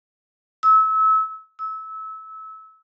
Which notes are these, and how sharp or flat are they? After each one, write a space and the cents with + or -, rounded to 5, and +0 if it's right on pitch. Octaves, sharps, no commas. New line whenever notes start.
E6 -30
E6 -25